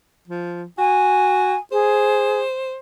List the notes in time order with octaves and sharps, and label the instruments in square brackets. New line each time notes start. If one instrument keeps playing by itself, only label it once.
[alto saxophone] F3
[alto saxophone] F#4 [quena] G#5
[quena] G#4 [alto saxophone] C5